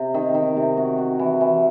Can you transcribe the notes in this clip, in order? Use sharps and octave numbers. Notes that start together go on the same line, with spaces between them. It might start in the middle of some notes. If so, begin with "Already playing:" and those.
Already playing: C3
D#3
D#3
C3
F#4
F#4
E3
E3